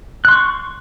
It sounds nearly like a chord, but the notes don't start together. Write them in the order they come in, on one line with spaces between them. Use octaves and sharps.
F#6 C6 C#6